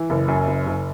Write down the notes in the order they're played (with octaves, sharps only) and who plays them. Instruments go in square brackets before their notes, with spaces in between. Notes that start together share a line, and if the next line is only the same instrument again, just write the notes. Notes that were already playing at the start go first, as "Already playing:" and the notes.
Already playing: [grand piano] E3
F#1
F#2
F#1
F#1